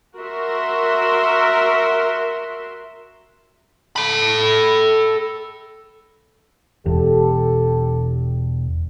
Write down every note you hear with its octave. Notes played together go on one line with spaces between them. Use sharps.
F#4 A#4 E5 C6
A4 B5
E1 G4 A4